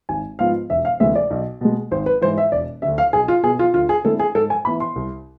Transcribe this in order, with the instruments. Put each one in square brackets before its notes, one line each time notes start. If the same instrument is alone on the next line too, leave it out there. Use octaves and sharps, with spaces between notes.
[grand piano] G#1 [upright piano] G#5
[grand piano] G#2 F3 B3 F4 [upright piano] F5
[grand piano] E1 [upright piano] E5
[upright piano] F5
[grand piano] D2 C3 E3 G#3 [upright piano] E5
[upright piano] D5
[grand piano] B1
B2 G#3
[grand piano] G#1 [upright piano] C5
[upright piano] B4
[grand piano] G#2 E3 [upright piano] C5
[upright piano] E5
[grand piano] E1 [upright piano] D5
[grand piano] D2 D3 [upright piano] E5
[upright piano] F5
[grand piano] B1 [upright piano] G#4
[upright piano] F4
[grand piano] B2 B3 [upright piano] G#4
[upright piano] F4
[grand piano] D2 [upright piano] F4
[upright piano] G#4
[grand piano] D3 G#3 C4 E4 [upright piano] A4
[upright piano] G#4
[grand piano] G#2 [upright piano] A4
[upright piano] G#5
[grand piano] E3 B3 E4 [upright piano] B5
[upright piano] C6
[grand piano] C2